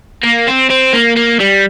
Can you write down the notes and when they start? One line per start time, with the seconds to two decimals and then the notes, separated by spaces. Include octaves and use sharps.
0.23 A#3
0.47 C4
0.70 C4
0.93 A#3
1.16 A#3
1.40 G3